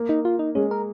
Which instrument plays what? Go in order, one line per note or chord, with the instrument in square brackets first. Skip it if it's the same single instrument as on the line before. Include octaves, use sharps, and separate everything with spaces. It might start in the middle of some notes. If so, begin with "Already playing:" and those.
Already playing: [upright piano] A#3
[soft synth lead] D#4
F4
D#4
[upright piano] G#3 [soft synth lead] C#4
[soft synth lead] A#4